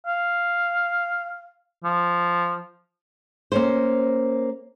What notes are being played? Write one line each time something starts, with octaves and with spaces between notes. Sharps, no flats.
F5
F3
A#3 C#4 C5